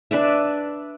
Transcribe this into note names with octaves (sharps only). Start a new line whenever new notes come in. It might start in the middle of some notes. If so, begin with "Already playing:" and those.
D4 B4 D5 E5